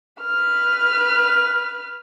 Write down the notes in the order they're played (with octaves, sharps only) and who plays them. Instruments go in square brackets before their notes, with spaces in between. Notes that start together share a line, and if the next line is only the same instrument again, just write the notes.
[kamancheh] B4 F6